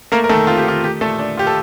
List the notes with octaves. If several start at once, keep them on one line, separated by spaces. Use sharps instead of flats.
A3 A#3 A#4
A#4
D#3 A3 A4
C4 F4
G4
D#3 F4
A3 G4
A#2 A3 A4
D4
F4 G4
A4